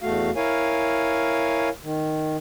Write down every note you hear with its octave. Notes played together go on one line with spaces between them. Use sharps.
E2 A3 F#4 F5
E4 A#4 C#5 F5 G#5
D#3